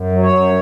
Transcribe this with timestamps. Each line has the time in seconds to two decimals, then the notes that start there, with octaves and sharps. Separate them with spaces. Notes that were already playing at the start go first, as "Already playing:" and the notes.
Already playing: F#2
0.12 F#3
0.23 C#5
0.33 F#2